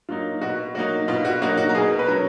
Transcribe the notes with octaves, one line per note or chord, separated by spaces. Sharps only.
F#3 A#3 D#4 F4
B2 F#4
F#3 A#3 D#4 F#4
B2 F4
F#4
F#3 A#3 D#4 F#4
F#4
A#4
B2 G#4
B4
F#3 C#4 A#4